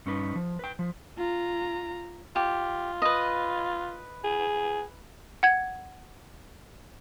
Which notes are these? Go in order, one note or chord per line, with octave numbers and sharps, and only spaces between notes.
G2 C#4 D#4 B4
F3
B4 G5
F3
F4 A#5
F4 G4
B4 D#5
G#4
F#5 G#6